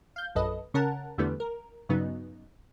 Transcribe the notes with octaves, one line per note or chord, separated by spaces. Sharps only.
F5 G6
A#1 F#2 A4 B4 D#5
C#3 C#4 A#4 F#5 A5
E2 D3 E3 G3 A3 B3
A#4
G2 C#3 F#3 B3 D#4